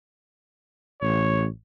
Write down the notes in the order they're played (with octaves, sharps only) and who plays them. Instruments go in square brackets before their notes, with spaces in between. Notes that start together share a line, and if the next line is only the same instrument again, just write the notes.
[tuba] A1 [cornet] C#5